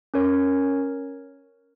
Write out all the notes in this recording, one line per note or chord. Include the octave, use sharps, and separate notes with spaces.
C#4 A#4 C#5